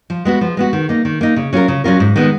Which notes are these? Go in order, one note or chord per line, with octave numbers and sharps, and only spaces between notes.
F3
G#3 B3 F#4
F3
G#3 B3 F#4
D#3
A#3 D#4
D#3
A#3 D#4
C#3
F#3 C#4 F4 A#4
C#3
F#3 C#4 F4 A#4
G#2
D#3 G#3 B3